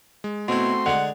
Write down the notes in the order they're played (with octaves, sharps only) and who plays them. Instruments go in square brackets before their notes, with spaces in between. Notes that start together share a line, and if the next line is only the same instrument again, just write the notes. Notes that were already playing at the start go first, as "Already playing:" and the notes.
[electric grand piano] G#3
[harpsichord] B2 E4 [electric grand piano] A3 C4 F#4 [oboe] C6
[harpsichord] D3 G#3 [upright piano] F#5